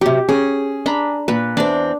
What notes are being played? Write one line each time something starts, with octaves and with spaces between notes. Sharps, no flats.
C3 F#3 G4
C#4 G#4
D4 A#5 B5
A#2 B4
E2 C4 D4 D5